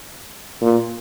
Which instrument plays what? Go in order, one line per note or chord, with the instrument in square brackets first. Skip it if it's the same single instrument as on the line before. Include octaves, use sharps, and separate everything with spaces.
[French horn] A#2